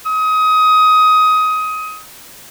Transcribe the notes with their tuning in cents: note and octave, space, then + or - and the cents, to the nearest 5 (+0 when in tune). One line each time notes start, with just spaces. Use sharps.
D#6 +20